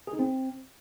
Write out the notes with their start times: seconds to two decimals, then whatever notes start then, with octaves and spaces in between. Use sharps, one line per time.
0.07 G#4
0.13 D#4
0.19 C4